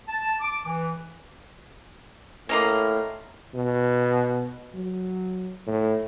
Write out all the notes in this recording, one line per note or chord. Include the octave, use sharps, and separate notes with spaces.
A5
D6
E3
A2 A#3 C#4 D#5 A#5 C6
B2
F#3
A2